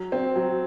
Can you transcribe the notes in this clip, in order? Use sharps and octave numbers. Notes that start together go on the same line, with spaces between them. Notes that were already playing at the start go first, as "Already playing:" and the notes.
Already playing: F#3
C4
F#3